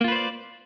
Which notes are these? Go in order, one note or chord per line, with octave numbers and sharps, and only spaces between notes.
A#3 F4 B4 C5 D5